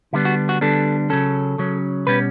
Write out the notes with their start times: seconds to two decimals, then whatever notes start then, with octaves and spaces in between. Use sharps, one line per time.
0.13 D3 G3 B3 D4 E4
0.25 F#4
0.49 F#4
0.61 D3 G3 B3 D4 A4
1.10 C#3 F#3 C#4 A4
1.58 C#3 F#3 C#4
2.07 B2 G3 C#4 B4